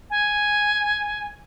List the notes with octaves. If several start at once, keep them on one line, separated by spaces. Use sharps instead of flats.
G#5